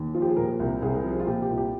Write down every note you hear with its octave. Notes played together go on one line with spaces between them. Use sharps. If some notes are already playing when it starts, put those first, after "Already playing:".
Already playing: D#2
F3 F4
G4
G#4
A#2 A#4
C2
C2 G#4
A#4
F3 G#4
F4
A#2 G4
G4
C2
G4